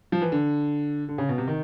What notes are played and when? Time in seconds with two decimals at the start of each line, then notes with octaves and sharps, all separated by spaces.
0.12 F3
0.22 E3
0.32 D3
1.08 D3
1.18 C#3
1.29 B2
1.38 C3
1.48 D#3